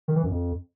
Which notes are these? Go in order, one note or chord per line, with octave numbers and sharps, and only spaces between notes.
D#3
E3
F#2
F2